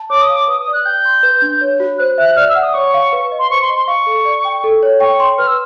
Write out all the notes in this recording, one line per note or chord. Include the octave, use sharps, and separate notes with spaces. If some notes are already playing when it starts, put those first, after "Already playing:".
Already playing: A5
C#5 D6
D#6
F5
D6
B4 D#6
D#6
D5
F#6
G5 G6
C6
B4
D4
C#5
F#4
C5 F#6
E5 F#6
D5 F6
E6
F#5
D#6
C#5 C#6
F5
B4
D#5
C6
C5 C#6
C6
D#5
C6
F5 C#6
A4
D5
G5
A4
C#5
G5 C#6
C6
B4 F6
E6